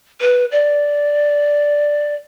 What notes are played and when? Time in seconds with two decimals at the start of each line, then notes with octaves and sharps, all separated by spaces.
0.21 B4
0.52 D5